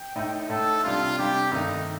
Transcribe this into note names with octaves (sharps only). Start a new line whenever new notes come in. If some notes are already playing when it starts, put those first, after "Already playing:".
Already playing: G5
A2 A3 D#4
A2 A3 D#4 A4
C3 G3 D4 F4
C3 G3 D4 G4
G2 D#3 A3 D#4